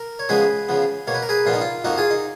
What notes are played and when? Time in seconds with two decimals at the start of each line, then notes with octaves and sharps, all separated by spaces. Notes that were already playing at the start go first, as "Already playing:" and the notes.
Already playing: A#4
0.19 C#5
0.29 C#3 F3 G#3 B3 G#4 B4
0.69 C#3 F3 B3
1.07 B2 A#3 C#5
1.14 B4
1.23 A#4
1.29 G#4 B4
1.46 A#2 F3 B3 F4
1.53 D#4
1.61 F4
1.84 F2 F3 A#3 D#4 F#4
1.98 F4 G#4
2.11 D#4